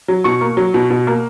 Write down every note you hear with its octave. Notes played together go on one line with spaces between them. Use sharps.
F#3
B2 C#6
A#3
F#3
B2
B2
A#3